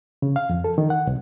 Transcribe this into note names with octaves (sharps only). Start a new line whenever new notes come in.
C#3
F5
F2
A4
D#3
F#5
C2